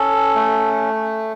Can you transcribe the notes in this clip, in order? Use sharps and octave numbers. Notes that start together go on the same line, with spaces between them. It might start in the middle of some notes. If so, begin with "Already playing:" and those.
Already playing: C#4 A4
A3